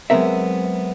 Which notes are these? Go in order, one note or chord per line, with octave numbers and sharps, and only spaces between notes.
F#3 G#3 B3 C4 A#4 E5